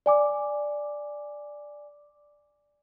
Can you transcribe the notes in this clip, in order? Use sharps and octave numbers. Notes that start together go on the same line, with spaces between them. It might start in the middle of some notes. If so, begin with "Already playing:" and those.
D5 G#5 D6